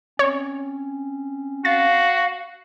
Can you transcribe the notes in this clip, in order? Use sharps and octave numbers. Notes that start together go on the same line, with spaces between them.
C4 C#4 C#5
F#4 F5 A6